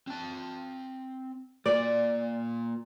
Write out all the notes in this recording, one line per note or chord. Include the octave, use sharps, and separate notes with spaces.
C4 A5
A#3 F4 D5